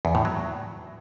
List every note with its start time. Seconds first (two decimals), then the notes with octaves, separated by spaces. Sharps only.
0.05 E2
0.15 A2
0.25 F#3